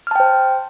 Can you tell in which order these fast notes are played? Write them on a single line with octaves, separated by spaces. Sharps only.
F6 A5 G5 C5